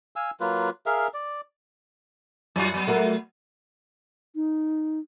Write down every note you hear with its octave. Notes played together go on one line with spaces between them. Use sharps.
F5 G#5 E6
F#3 A#3 F4 B4
G#4 A#4 E5 F5
D5
F#2 F#3 F4 F#4
F#3 B3
A3 F#4 A#4
D#4